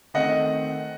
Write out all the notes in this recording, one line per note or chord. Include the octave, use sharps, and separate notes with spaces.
D#3 A3 C4 D#5 F#5